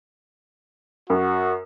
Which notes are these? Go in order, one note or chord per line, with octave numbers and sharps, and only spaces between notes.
F#2 F#4